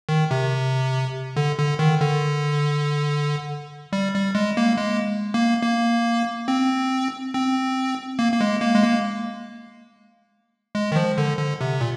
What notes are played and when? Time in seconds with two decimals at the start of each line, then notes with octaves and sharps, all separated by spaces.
0.09 D#3
0.31 C3
1.36 D3
1.59 D3
1.79 D#3
2.01 D3
3.93 G3
4.14 G3
4.35 G#3
4.57 A#3
4.77 G#3
5.34 A#3
5.63 A#3
6.48 C4
7.34 C4
8.19 A#3
8.32 A#3
8.41 G#3
8.62 A#3
8.75 G#3
8.83 A#3
10.75 G#3
10.92 D#3
10.96 F3
11.18 D3
11.38 D3
11.61 C3
11.81 A#2